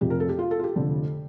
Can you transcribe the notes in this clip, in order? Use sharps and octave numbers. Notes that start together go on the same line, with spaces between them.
F1 F2 C3 F3 G4
A#4
A4
G4
F4
A4
F4
G4
F1 F2 D3 F3